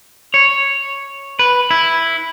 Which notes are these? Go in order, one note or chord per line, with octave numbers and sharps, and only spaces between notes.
C#5
B4
E4